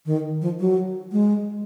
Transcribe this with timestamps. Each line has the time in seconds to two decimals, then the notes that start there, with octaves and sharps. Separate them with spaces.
0.06 D#3
0.41 F3
0.60 F#3
1.12 G#3